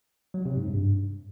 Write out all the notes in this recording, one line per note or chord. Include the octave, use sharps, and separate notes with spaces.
F#3
C3
G#2
G2